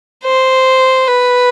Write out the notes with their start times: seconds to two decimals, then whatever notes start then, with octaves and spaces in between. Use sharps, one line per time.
0.24 C5
1.07 B4